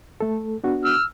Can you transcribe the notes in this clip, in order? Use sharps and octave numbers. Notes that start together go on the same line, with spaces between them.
A3 A4
B3 D4 F#4
E6 F6